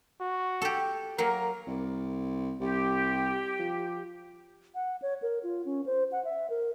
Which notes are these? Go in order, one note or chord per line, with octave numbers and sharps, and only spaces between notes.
F#4
G4 A4
F#3 A#3 A#4
C2
C2 G4
F3
F#5
C#5
A#4
F4
C#4
C5
F#5
E5
A#4